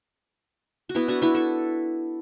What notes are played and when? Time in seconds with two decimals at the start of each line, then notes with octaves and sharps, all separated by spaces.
0.89 F#4
0.95 B3 E4
1.08 D4 F#4
1.22 B3 E4
1.35 E4 A4